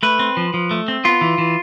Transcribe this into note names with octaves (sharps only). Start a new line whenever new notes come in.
A3 B4
C4
F3
F3
A3
C4
B3 F4
E3
E3